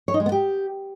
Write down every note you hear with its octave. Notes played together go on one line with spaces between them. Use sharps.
C#5
D#4
G#3
B3
G4